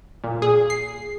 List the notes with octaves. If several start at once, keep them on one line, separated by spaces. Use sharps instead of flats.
A#2
G#4
C7